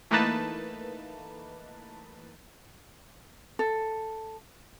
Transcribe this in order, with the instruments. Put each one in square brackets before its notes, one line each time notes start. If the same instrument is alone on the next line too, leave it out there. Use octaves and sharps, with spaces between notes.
[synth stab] E3 A3 A#3 D#4 B4 A5
[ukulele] A4